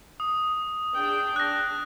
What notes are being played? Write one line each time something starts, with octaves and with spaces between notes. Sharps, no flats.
D#6
D4 G#4 G5
D4 F#6 A#6